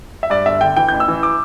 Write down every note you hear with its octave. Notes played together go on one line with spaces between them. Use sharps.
E5
G2 D5
G1 E5
D3 G5
E3 G5
A1 G6
E6
E3
D6